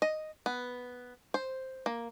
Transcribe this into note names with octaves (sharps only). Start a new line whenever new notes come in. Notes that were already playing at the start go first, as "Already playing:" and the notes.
D#5
B3
C5
A#3